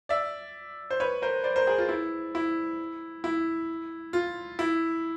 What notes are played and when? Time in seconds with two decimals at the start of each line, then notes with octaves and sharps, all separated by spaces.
0.09 D5 E5
0.90 C5
1.00 B4 C#5
1.22 A#4 C5
1.44 C5 D5
1.56 A#4 C5
1.67 G#4 A#4
1.78 F4
1.89 E4
2.35 E4
3.24 E4
4.13 F4
4.59 E4